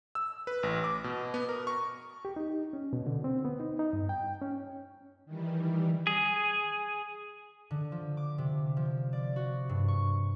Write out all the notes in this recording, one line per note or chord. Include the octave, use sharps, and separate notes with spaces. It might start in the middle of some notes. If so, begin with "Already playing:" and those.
E6
B4
A1
D6
B2
B3
A#4
C#6
G4
D#4
C#4
B2
D3
C4
B3
D#4
D#4
G2
G5
C#4
D#3 E3 G3
G#4
D3
F3
D6
C3
F3
D5
F#4
G2
C#6